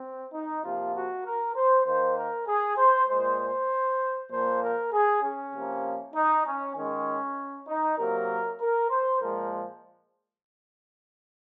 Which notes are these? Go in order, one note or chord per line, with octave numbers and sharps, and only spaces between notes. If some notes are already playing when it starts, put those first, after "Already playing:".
Already playing: C4
D#4
C3 F3 A#3 F4
F#4
A#4
C5
D#3 A#3 C5
A#4
G#4
C5
A#2 G#3 C5
C5
A#2 F3 A#3 C5
A#4
G#4
C#4
C3 F3 A#3
D#4
C#4
D#3 G#3 C#4
D#4
C3 F#3 A#3 A#4
A#4
C5
A#2 F3 G#3 A#4